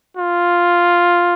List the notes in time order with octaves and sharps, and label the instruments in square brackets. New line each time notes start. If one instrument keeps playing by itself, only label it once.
[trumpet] F4